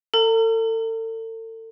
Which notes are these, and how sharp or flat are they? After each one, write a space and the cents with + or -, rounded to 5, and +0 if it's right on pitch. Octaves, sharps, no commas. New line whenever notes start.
A4 +35 A#5 -35